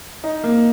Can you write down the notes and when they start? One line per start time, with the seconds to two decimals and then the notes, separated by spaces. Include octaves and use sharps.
0.24 D#4
0.44 A#3